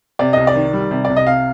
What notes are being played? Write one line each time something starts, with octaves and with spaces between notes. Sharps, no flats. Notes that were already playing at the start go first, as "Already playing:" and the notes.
C3 D5
C2 D#5
D5
D#3
G3
C3
C2 D5
D#5
C3 F5